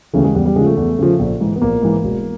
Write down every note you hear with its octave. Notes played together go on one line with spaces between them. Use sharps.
D#2 C#3 E3 A3
G#3
E2 G3
G3
C#3 F3 G#3
A3
E2
C#3 F3
A#1
G#2 E3
B3
A#1 A#3
G#2 E3
E1